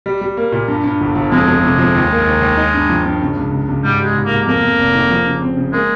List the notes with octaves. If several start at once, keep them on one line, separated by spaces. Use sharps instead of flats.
G3
G3
A#3
A#2
G2
G2
G1
G1
F2 G#3
F2
C3
F3
D#2
A#3
D#2
D#2
D#4
G2
F3
G2
C#3
C#2
C#2
C#2
G#2 G3
G3 G#3
G#2
G#2 A#3
F2 A#3
F2
F1
D#3
F3
C#3
C4
C#3
G#3 A#3